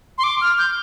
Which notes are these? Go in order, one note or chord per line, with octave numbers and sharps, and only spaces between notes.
C6
D6
F6
G6